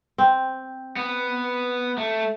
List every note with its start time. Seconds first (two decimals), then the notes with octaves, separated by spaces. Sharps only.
0.18 C4
0.96 B3
1.98 A3